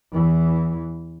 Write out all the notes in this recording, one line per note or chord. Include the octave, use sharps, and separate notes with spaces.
E2 E3